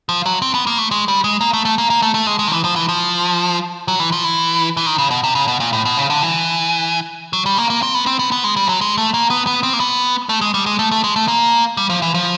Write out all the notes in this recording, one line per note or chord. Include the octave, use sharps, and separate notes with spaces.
F3
F#3
C4
B3
A#3
A3
G#3
G3
G#3
A#3
A3
A3
A#3
A#3
A3
A3
G#3
G#3
D#3
E3
F3
E3
F3
F#3
E3
F3
E3
E3
D#3
C#3
B2
C3
C#3
B2
A#2
A2
B2
C#3
D3
E3
F#3
G3
A#3
A#3
C4
B3
C4
B3
B3
G#3
G3
F#3
G#3
A3
A#3
B3
B3
C4
A#3
B3
A3
G#3
G3
G#3
A3
A3
G#3
A3
A#3
G3
F3
E3
F3